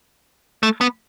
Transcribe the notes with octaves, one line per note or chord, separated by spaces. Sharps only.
A3
B3